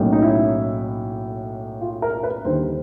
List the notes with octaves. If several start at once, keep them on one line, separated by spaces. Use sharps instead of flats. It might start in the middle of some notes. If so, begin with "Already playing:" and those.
Already playing: B1 A2 F#3 A#3 C#4
D#4
E4
F4
A#4
B4
D#2 D3 G3 C5